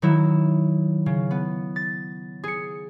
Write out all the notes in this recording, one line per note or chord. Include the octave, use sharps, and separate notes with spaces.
D#3 F#3 E4
C#3
B3
A6
G#4 C#7